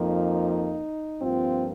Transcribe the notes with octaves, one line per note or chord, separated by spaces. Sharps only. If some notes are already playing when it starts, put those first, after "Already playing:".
Already playing: F2 F3 A#3 D#4
G2 F3 A#3 C4 F4